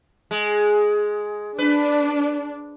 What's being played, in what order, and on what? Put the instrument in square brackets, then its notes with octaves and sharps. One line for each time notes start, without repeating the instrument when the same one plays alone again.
[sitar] G#3
[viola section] D4 [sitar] B4